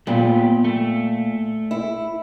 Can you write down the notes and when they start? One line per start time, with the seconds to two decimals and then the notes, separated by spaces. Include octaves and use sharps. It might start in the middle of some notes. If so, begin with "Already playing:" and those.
0.07 A#2 A3 B3 G4
0.64 A3
1.71 E4